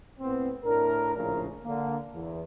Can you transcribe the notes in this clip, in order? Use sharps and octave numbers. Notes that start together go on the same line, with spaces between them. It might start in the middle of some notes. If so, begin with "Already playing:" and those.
A2 B3 C4
A2 D4 A#4
A#1 A2 C#3 F3 A#4
D3 A#3
E2